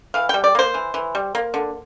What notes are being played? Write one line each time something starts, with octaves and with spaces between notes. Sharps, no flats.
E3 F5
G3 G5
D5
A#3 C5
E3
E3
G3
A#3
D3